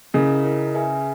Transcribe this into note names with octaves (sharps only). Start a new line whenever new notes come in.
C#3 C#4 E4 A#4 D#5
C#4 E4 A#4 D#5
G#4 B4 E5 G#5